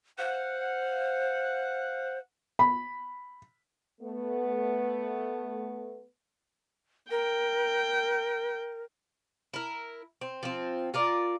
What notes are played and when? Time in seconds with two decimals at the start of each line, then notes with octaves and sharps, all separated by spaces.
0.18 C5 F5 F#5
2.59 B5
4.01 A3 B3
7.11 A#4 G5
9.54 E4 A#4
10.21 C4
10.43 F3 C4
10.94 F4 A#4 D5